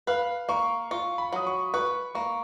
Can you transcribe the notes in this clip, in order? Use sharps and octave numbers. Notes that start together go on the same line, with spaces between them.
B4 F5
A#3 C#6
F4 C#6
B5
F#3 D#6
C#6
B4 C#6
A#3 C#6